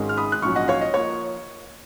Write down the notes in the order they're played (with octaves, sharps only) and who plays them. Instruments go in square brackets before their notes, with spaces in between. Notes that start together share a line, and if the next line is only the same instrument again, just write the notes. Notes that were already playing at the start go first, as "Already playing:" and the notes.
Already playing: [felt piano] G#1 G#2 D#3 G#3 C#4
F6
B5 D#6
F#6
A#1 G#2 F#3 C#4 C#6 F6
D#5 F#5
C#5 F5
D#5
F3 A#3 C#5